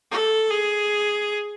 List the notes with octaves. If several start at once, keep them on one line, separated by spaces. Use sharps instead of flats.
A4
G#4